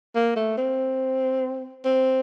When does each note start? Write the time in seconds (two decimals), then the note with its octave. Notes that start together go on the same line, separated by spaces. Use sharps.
0.15 A#3
0.36 A3
0.58 C4
1.85 C4